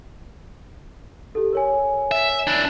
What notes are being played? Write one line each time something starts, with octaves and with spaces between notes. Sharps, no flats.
G4 A4
A#4 C#5 G#5
E5
D4 E4